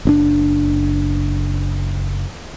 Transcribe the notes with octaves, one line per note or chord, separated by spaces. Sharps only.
F#1 C4 D4